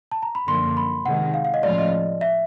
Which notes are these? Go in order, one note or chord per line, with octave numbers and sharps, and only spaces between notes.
A5
A#5
B5
F#2 D3 F3 A#3 C6
B5
C3 D#3 G#3 F#5
F5
F5
D#5
A2 F3 G#3 C#4 F4 D5
D#5
E5